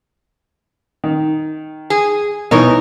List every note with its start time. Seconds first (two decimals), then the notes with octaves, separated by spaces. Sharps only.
1.04 D#3
1.90 G#4
2.51 B2 E3 D#4 A#4 C#5